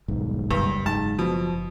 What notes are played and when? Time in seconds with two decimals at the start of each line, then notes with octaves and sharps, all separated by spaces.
0.08 D#1 B1 G#2
0.51 F#1 G2
0.86 G#2 A5
1.19 B2 F3